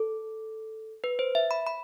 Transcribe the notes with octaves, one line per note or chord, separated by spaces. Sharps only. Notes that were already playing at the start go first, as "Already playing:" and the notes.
Already playing: A4
B4
C5
E5
B5
B5